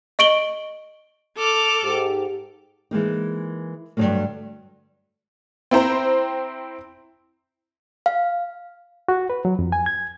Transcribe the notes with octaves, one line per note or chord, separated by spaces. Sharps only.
D#5 C#6 D7 F#7 G7
A4 D6 F6
G#2 G4
E3 G#3 A#3 D#4
G2 D3 F3 F#3 A3 A#3
C4 E4 C5 A#5
F5
F#4
B4
F#3
F2
G#5
G#6